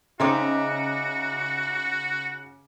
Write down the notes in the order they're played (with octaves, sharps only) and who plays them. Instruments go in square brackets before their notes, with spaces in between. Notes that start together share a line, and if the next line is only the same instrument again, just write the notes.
[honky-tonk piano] C#3 [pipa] G#3 C4 D#4 [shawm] F#4 [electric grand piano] E5 A#5 D6